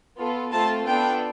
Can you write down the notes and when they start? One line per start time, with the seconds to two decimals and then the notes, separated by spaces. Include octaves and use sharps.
0.17 B3 F4 A4
0.52 A3 C4 F4 A4 A5
0.86 B3 D4 F4 A4 G5